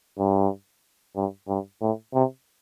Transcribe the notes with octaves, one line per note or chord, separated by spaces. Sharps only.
G2
G2
G2
A2
C3